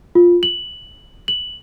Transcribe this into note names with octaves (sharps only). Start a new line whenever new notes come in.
F4
F#7
F#7